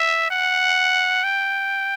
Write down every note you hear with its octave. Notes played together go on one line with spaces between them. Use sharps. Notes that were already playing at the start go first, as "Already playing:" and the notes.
Already playing: E5
F#5
G5